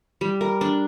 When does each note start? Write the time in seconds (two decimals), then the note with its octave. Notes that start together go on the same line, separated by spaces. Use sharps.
0.21 G3
0.41 A#4
0.61 D4